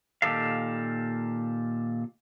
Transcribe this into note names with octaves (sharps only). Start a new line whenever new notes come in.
A#2 D#3 G4 A4 F5